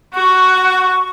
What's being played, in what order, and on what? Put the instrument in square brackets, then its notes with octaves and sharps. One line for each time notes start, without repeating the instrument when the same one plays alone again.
[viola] F#4 [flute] C#6